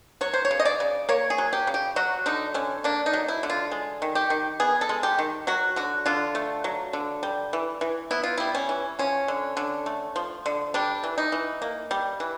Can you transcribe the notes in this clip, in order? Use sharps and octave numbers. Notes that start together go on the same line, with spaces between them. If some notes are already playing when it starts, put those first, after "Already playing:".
F#3 C#5
C5
C#5
C#3
D#5
D5
C#3
A#3 C#5
G#4
F#3
G4
C#3
G4
F#3 F#4
D3 D#4
D3 C#4
A#3 D4
D#4
F#3
E4
D3
F4
G#3
D#3
G4
D#3
B3 G#4
A4
G#3
G4
D#3
F#3 F#4
D3 F#4
D3 F4
A3
F#3
D3
G3
E3
E3
B3 E4
F4
G3 E4
C#4
E3
F3 C#4
D3
D3
A3
F3
D3
G3 D4
E3
D#4
E3
A#3
G3
E3